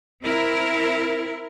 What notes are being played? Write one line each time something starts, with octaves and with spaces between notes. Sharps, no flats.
C4 E4 A#4